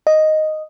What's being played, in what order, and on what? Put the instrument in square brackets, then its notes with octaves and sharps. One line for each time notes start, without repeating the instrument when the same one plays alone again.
[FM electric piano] D#5